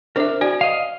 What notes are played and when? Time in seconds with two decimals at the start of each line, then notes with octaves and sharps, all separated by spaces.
0.16 D4 A#4 C5 E5
0.41 F#4 D5 G#5
0.61 D#5 F5